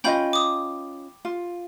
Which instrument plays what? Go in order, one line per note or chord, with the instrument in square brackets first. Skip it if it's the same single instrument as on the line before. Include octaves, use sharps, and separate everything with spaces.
[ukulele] C#4 F4 D#5 [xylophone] G5 B5 G6
[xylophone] D6 D#6
[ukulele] F4